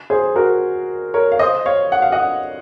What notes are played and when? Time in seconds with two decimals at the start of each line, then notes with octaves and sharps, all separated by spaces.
0.10 G#4 C5
0.36 F#4 A#4
1.14 A#4 C#5
1.32 F5
1.39 C5 D#5
1.66 C#5 F5
1.92 F#5
2.02 F5
2.12 D#5 F#5